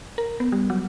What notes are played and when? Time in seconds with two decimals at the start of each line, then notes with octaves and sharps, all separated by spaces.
0.18 A#4
0.40 B3
0.52 G3
0.70 F#3